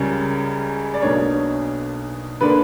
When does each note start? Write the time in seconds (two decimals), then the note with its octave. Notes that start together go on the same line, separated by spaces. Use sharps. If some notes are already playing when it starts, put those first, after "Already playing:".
Already playing: C#2 C#3 G3 C#4 A#4
0.94 D5
1.02 B1 B2 A#3 D4 C#5
2.41 D3 A#3 D4 B4